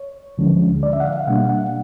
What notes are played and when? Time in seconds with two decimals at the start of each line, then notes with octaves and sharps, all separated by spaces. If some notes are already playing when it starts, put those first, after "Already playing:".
Already playing: C#5
0.38 D2 D3 F3 G#3 C#4
0.83 D5
0.93 E5
1.00 F#5
1.05 F5
1.16 F5
1.27 B2 G3 A#3 D4 F#5
1.49 F#5